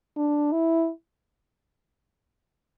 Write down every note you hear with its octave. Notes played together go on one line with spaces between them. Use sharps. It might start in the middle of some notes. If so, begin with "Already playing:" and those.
D4
E4